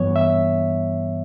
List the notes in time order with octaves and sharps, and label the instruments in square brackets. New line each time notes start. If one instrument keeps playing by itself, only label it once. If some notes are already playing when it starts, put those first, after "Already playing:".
Already playing: [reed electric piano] G2 E3 G3 B3 C#5
E5